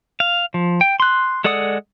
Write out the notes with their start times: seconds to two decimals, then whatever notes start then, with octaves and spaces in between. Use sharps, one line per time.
0.20 F5
0.54 F3
0.81 G5
1.00 C6 F#6
1.44 G#3 A4 D5 F#5 D#6